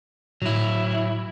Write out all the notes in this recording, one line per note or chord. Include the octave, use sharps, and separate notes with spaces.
A2 F#3 E4